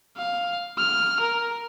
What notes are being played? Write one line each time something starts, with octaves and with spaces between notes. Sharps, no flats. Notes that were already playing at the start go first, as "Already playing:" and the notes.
F5
F6
A#4